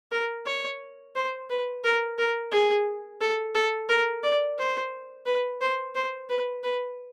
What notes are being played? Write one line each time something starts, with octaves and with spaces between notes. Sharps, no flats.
A#4
C#5
C5
B4
A#4
A#4
G#4
A4
A4
A#4
D5
C5
B4
C5
C5
B4
B4